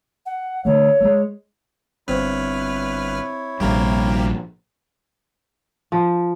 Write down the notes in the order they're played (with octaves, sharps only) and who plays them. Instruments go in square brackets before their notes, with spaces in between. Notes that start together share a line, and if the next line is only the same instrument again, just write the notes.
[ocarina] F#5
[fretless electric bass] D3 A3 [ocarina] C#5
[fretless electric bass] G#3 A3
[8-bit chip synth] G1 B4 F6 [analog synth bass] C4 [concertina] E4 C#5
[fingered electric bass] A#1 G2 [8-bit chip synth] C3 A#3 G4
[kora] F3